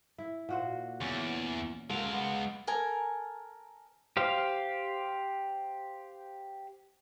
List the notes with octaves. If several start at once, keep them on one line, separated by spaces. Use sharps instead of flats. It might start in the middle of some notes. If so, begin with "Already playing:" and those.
E4
A#2 F#4 C5
E2 C#4
G#3 A4 A#4 F5 F#5
B3
A4 A#4 G#5
G4 C5 F5